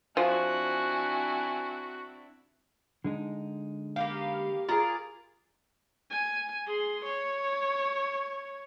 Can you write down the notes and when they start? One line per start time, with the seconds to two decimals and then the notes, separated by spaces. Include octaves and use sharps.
0.17 F3 C4 D4 E4 F#4 G#5
3.04 D3 G#3 D#4
3.96 A#3 B3 G4 F5
4.69 F4 G#4 A#4 D5
6.11 G#5
6.67 G#4 C6
7.05 C#5